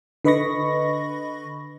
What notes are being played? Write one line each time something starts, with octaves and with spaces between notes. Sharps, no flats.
D3 B4 D#5 B5 C#6 A#6